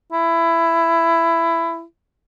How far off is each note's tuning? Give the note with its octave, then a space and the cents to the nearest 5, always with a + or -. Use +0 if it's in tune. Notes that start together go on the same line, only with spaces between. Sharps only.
E4 +15